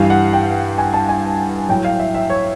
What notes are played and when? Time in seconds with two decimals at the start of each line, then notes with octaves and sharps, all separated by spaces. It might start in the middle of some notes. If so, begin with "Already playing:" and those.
Already playing: G2 E3 G3 F5
0.10 F#5
0.33 G5
0.78 G#5
0.94 A5
1.09 G#5
1.69 A2 F#3 G5
1.85 F5
1.99 E5
2.14 E5
2.30 C#5